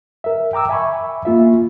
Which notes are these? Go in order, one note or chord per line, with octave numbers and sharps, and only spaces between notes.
A#4 E5
G5 A#5 D6 E6
E5 G#5 B5 C#6
A#3 F4 E5